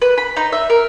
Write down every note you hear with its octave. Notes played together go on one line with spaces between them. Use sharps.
B4
B5
D#4
E5
A#4